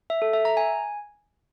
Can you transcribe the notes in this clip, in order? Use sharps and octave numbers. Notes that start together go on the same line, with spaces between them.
E5
A4
E5
A#5
G#5